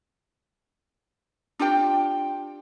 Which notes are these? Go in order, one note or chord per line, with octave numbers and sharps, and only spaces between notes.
D4 F4 G4 G5